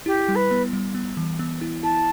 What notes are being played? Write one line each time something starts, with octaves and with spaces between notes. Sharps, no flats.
E4 G4
G3
B4
B3
G3
B3
E3
B3
E4
E4 A5